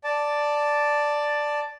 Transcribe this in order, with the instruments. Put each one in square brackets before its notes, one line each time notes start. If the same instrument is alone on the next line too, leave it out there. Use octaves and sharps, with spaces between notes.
[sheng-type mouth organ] D5 A5